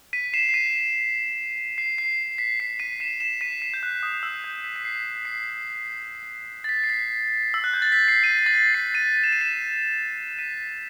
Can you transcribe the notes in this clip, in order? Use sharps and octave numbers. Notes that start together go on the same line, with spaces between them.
B6 D#7
C7 E7
C7
B6 D#7
C7
C7
B6
C7
B6 D#7
C7 E7
C7 E7
B6 D#7
C7
G6
F#6
D#6
E6
G6
B6
B6
C7
C7
A6
B6
C7
B6
E6
F#6
G6
A6
B6
C7
B6 D#7
B6
A6
B6
C7
B6 D#7
E7
D#7
C7 E7
B6 D#7